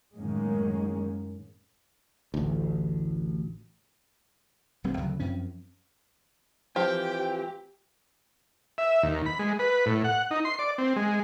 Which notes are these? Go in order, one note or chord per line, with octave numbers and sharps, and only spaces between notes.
F#2 A2 D#3 G#3 A#3 C#4
A1 D2
D1 D2 G3 C4
D2 C#3 F#3
F#2 F3 C4 C#4
E3 F3 C4 G4 G5
E5
D#2
B5
G#3
B4
A2
F#5
D#4
C6
D5
C4
G#3